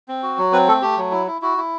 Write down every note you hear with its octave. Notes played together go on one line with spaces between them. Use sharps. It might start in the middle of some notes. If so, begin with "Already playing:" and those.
C4
F#4
F#3
C4 B4
A3 A4
A3 G4
F#3
E4
E4
E4 F#4
E4